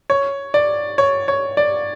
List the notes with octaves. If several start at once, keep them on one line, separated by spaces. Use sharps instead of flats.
C#5
D5
C#5
C#5
D5